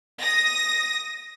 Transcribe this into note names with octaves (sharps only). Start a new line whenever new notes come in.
D#6 A#6